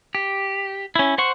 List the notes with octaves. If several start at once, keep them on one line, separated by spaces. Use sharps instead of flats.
G4
C#4 E4
C5 F#5 C#6